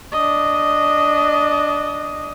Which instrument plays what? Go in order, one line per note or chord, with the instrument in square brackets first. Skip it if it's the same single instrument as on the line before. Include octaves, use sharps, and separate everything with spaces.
[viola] D4 D#5